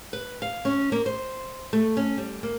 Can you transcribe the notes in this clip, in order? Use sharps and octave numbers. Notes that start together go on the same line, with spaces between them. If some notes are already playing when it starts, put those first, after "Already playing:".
B4
F5
C#4
A#3
C5
A3
C#4
G3
A#3